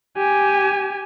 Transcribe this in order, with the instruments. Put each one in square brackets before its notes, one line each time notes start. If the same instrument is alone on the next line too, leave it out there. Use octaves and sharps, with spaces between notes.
[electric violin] G4 G#5